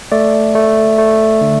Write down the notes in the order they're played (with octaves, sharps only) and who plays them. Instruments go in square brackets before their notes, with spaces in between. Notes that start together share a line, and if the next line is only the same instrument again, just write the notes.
[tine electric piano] A3 D5
A3
A3
D3